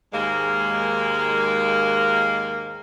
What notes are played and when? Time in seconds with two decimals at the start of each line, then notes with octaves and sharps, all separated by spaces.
0.13 D#2 G#2 G#3 A#3